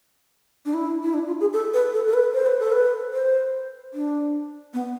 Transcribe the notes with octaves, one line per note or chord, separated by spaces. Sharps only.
D4
E4
E4
D4
F4
G#4
A4
B4
A4
A4
B4
C5
B4
A4
B4
C5
D4
B3